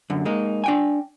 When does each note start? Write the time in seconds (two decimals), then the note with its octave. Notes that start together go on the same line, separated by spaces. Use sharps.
0.10 F#2 D3
0.25 G#3 A#3 D#4
0.64 D4 G5 G#5